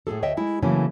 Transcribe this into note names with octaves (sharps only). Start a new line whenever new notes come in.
A2 A3 G#4 A4
D2 C#5 D#5 E5 G5
G#3 E4
C#3 E3 F#3 A3 A#3 C#4